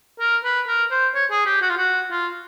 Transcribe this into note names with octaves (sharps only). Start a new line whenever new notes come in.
A#4
B4
A#4
C5
C#5
G#4
G4
F#4
F4
F#4
F4